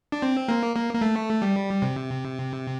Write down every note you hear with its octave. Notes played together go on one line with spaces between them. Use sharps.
D4
C4
A#3
A#3
A#3
A3
G3
C3